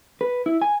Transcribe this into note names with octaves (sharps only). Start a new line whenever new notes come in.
B4
E4
G#5